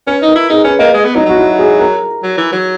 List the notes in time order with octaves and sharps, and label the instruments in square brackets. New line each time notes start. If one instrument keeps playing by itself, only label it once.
[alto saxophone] C#4 [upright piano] B4
[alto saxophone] D#4
[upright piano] A#4
[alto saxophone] E4
[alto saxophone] D#4 [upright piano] G#4
[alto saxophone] C#4 [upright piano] B4
[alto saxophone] A#3 [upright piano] D#5
[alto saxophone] G#3
B3
[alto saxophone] F#3 [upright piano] D#4
[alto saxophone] F#3 [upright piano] F#4
[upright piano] E4
G#4
A#4
[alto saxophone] F#3
E3
F#3